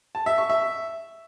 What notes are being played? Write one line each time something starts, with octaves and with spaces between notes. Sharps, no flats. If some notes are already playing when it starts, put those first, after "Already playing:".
A5
E5
C#6
E5